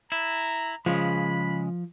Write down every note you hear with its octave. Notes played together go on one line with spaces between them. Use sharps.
E4 A#5
C#3 F3 G#3 B5